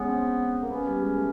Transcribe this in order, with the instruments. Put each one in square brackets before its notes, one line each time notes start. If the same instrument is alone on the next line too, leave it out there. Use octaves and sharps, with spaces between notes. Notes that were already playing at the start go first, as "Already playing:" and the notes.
Already playing: [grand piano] G#3 C#4 [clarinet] B3
[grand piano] C4
A#3
[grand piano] B3 [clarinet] C#4
[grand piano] G3
G#3
A3